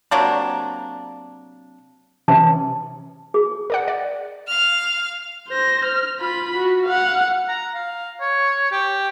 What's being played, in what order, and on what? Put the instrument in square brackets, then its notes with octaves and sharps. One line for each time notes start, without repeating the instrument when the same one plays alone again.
[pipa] C3 F#3 A#3 D4
[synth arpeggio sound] C3 E3 C#4 [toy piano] A5
[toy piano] G#4
[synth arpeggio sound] A#4 D5 F#5
D5
[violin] F5 F6
[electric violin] C5 A#6
F6
F4 B5
F#4
F5 F#5
[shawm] A#5
F5
C#5
G4